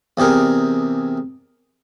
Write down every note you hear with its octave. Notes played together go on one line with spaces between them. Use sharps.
E2 C3 G4 G#4 A#4